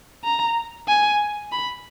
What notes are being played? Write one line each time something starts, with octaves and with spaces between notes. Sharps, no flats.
A#5
G#5
B5